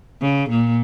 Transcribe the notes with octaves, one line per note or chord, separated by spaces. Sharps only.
C#3
A#2